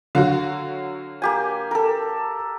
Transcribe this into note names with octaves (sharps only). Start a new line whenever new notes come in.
D3 F#3 F#4 F5
A#3 G4 G#5
A4 A#4